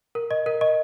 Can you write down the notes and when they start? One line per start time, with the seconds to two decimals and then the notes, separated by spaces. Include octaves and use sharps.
0.15 A#4
0.31 D#5
0.46 A#4
0.61 D#5